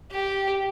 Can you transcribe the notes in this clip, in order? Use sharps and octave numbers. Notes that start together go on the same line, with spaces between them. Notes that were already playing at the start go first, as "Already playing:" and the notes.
G4